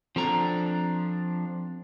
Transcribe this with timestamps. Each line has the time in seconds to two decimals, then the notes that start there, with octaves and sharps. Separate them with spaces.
0.16 F3 C4 D4 A4 A#5